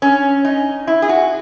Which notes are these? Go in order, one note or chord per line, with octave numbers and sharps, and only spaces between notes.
C#4
D#4
E4
G#4
F#4